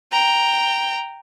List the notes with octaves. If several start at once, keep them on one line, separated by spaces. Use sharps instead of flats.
G5 A#5